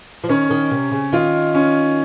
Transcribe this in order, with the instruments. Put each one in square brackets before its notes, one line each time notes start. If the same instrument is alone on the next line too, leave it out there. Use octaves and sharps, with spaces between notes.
[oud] F3
[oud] D#3 [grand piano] C#4
[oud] D#3
C3
C#3
[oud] D#3 [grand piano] F4
[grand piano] C#4